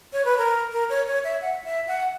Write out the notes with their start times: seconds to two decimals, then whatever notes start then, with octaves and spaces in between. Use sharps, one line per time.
0.13 C#5
0.25 B4
0.38 A#4
0.72 A#4
0.89 C#5
1.07 C#5
1.24 E5
1.41 F#5
1.65 E5
1.87 F#5